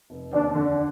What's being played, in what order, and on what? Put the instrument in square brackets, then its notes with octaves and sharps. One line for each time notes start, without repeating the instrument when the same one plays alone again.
[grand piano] F1
[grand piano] D#2 [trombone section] D4
[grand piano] D3